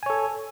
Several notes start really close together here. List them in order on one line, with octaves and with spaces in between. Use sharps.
G#5 C#5 A4